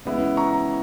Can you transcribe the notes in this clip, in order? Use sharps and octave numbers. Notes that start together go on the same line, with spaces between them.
C#3 E3 G#3 B3 E4
A#5 C#6